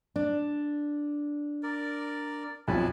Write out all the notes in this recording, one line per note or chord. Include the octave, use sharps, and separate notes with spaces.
D4
A#4 D5
B1 F2 F#4 G#5 A5 B5